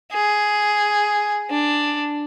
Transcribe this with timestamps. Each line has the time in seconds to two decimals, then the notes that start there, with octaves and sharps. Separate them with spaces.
0.13 G#4
1.50 D4